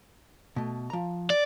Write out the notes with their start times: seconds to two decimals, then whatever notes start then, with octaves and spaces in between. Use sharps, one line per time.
0.56 B2 A3
0.90 F3 A#5
1.30 D5